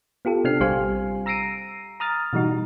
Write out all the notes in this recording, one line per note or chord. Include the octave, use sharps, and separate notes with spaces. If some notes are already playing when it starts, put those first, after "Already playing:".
B3 F4 G4 A4
C3 C4 D4 F6 C7
A#1 G3 G4 C5 F5 G#5
A#5 E6 A#6 C7 D7 D#7
A#5 D#6 F6 A6
B2 E3 G3 D#4 F#4